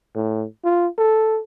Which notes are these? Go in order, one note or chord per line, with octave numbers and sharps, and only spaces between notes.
A2
F4
A4